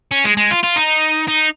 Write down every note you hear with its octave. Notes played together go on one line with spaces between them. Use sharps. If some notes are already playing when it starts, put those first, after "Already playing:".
C#4
G#3
G#3
F4
F4
D#4
D#4